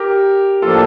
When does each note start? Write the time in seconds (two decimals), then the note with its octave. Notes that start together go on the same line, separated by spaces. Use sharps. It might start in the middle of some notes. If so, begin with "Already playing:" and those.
Already playing: G4 A#4
0.62 A2 F3 A#3 D4 F4 A4